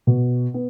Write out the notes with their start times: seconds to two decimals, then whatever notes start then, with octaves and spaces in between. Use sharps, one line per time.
0.07 B2
0.54 B3